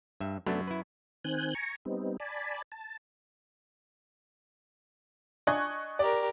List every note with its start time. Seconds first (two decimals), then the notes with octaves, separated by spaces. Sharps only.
0.20 G2 E5
0.47 F#2 A3 B3 D4
0.68 E4 B4
1.24 D#3 C4 G#5 F#6 G6
1.55 G#5 A#5 C#6
1.85 G3 B3 C4 D#4
2.20 D5 G#5 A5 B5
2.72 A5
5.47 D4 D#5 G#5 C#6 F#6 G#6
5.99 G4 A#4 D5